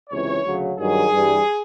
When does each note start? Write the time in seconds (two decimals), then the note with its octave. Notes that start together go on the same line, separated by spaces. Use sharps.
0.10 C#2 C3 E3 C#5
0.44 D2 C#3 F#3
0.78 G2 D#3 F#3 G#4
1.11 G2 E3 G3